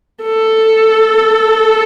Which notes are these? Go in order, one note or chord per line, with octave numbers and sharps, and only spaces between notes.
A4